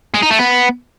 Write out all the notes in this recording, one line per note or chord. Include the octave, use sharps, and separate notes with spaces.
G#3
D#4
A3
B3